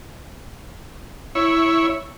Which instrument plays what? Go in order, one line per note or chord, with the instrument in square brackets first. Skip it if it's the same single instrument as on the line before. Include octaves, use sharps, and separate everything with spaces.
[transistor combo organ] E4 C#5